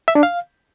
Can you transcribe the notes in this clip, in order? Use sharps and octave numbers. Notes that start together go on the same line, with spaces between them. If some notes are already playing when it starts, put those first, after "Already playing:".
E5
D4
F5